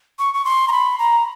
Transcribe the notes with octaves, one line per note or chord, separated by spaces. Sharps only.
C#6
C#6
C6
A#5
B5
A#5